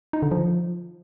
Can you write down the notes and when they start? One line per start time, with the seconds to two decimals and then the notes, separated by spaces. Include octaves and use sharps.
0.13 D#4
0.22 D3
0.31 F3